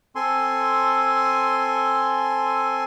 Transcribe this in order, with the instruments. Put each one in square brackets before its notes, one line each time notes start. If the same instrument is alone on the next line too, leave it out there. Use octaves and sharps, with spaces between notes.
[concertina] C4 A4 G#5 C6